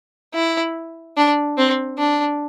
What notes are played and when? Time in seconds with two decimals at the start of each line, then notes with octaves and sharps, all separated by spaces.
0.34 E4
1.17 D4
1.58 C4
1.98 D4